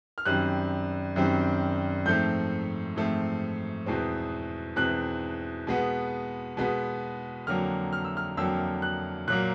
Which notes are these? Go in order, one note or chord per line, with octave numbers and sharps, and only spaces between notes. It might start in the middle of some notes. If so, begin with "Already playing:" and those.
F6
F#2 D#3 G3 C4 F#6
F#2 D#3 G3 C4
G#2 F3 A3 C4 G6
G#2 F3 A3 C4
E2 B2 G#3 C4
E2 B2 G#3 C4 F#6
B2 G#3 B3
B2 G#3 B3
F2 D3 F#3 A#3 F6
F6
E6
F6
F2 D3 F#3 A#3 E6
F#6
A#2 F#3 A#3 F#6